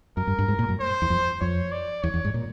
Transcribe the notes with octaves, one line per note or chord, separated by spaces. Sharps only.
F#2 A#4
G2
G2
G#2
A#2
F#2
C5
E2
F2
F2 C#5
D5
E2 C#5
E2
G#2
A#2